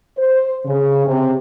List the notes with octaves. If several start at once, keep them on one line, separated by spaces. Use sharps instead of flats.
C5
C#3
C3